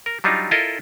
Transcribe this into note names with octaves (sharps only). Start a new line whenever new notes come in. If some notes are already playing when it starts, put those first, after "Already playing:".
A#4
F#3 G3 D4 D#4 F4
E4 F4 A4 A#4 D#5